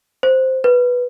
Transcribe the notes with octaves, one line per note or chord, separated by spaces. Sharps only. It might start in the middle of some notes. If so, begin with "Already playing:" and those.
C5
B4